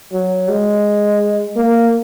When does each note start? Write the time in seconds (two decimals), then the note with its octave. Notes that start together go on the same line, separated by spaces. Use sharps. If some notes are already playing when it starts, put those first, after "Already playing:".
0.13 F#3
0.49 G#3
1.56 A#3